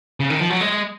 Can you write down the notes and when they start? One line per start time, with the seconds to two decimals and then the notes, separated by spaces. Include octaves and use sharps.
0.20 C#3
0.30 D#3
0.40 F3
0.50 F#3
0.61 G#3